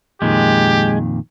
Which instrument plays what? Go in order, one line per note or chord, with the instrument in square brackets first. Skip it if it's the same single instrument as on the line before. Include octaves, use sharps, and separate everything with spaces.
[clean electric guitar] F2 A#2 D#3 [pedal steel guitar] G#3 [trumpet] G4